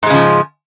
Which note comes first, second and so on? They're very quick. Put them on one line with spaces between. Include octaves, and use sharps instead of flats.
G#2 G#3 C#3 F3